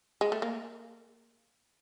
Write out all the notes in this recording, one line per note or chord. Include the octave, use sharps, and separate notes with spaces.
G#3
A3
A#3